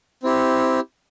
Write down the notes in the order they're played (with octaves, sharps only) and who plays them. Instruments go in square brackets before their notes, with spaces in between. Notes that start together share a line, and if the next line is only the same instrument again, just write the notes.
[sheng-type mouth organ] C4 E4 G4